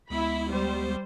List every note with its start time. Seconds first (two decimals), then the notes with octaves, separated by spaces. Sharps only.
0.10 D2 G#3 B3 E4 B5
0.51 G3 C5